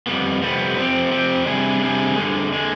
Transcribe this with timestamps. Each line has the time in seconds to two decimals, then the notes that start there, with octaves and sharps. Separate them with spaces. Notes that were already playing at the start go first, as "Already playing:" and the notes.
0.07 F2 C3 G3 B3
0.42 F2 C3 G3 B3
0.76 F3 C4 G4
1.11 F3 C4 G4
1.46 C3 G3 D4 G#4
1.81 C3 G3 D4 G#4
2.16 G2 D3 G#3
2.52 D3 G#3